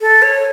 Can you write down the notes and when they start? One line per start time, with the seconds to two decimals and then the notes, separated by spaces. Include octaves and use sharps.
0.01 A4
0.22 C#5